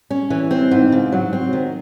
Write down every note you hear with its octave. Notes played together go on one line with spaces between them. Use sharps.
C#4
E3
C4
G#2
C#3
F#3
C4
D#3